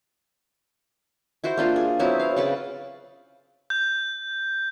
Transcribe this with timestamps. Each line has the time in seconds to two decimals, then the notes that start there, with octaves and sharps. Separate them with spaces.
1.44 E4 F#4 C5
1.57 A#3 D4 F4
1.76 G#4
1.99 F#3 B3 C4 E4
2.20 F5
2.36 C#3 B4 D5
3.70 G6